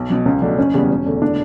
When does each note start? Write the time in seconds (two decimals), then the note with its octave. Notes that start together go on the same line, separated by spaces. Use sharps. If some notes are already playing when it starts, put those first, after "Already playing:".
Already playing: B1
0.10 B2 F#3
0.26 C#2 C#4
0.42 B2 F#3 A3 D4
0.58 F#1 C#4
0.74 E2 C#3 G3 B3
0.90 E1
1.06 E2 D3 A3
1.22 D4